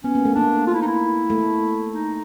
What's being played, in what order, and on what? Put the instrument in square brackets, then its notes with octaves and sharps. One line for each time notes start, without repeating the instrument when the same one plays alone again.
[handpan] B3 [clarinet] C#4
[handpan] A#3
A3
[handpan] A#3 [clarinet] D4
[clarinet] F4
E4
D#4
E4
[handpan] A3
[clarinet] D#4